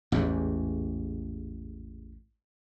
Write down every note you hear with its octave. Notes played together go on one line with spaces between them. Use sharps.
A1 E2 G#2